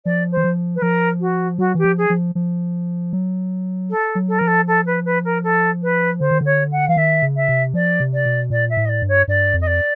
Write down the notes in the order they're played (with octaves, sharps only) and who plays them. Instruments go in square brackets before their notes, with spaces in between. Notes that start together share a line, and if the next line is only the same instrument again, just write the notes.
[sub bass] F3 [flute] D5
[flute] C5
[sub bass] E3
F3
[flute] B4
[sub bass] F3 [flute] A#4
[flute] F#4
[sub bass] F#3 [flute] F#4
[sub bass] E3 [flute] G4
[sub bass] F3
[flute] G#4
[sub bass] F3
F3
F#3
[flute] A4
[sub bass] F#3
[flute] A4
[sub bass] F3 [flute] A#4
[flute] A4
A4
B4
B4
A#4
A4
B4
[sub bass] D3 [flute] C5
[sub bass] D#3
[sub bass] D3 [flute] C#5
[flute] F#5
[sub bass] E3 [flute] F5
[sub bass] D#3 [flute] E5
[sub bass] C#3
[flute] E5
[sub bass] C3
[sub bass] F3 [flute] D5
[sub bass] C3
[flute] D5
[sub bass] B2
[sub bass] A#2 [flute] D5
[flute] E5
[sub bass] A2
[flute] D#5
D5
[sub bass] G2
[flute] C#5
[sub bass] G2 [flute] D5
[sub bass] F2
[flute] D#5
D5